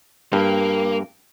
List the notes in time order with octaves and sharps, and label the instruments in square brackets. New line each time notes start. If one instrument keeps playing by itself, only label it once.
[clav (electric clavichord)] G2 [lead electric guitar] A#3